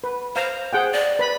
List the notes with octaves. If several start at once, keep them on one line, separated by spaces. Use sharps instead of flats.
B4
C5 F5 A#5
G#4 F#5 G5
D5
B4 B5